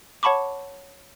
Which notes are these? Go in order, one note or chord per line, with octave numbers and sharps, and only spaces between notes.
C#5 F#5 A5 B5 C#6 D6